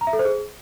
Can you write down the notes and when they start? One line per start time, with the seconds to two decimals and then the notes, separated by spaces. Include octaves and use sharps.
0.01 A#5
0.07 E5
0.13 A4
0.19 C5
0.25 G#4